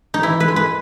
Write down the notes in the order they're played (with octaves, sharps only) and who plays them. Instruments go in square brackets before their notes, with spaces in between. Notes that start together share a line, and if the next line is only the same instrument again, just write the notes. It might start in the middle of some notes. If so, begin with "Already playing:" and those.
[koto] D#4
E3 E4
B4
G#3
B4